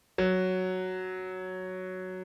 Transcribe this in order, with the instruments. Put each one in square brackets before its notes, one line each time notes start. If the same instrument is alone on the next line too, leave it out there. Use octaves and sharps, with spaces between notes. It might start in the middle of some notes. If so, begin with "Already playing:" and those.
[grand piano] F#3